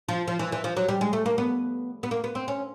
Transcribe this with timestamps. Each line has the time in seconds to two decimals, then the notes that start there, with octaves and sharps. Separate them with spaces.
0.08 F3
0.28 F3
0.39 E3
0.52 E3
0.64 F3
0.77 F#3
0.88 G3
1.01 G#3
1.13 A3
1.26 A#3
1.38 B3
2.03 B3
2.11 A#3
2.24 B3
2.35 C4
2.48 C#4